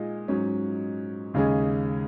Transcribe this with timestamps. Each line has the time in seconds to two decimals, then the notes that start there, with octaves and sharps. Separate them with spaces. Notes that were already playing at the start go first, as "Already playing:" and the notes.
Already playing: A#2 G#3 D#4 G#4
0.28 G#2 F#3 C#4
1.34 D#2 C#3 G#3 C#4 G#4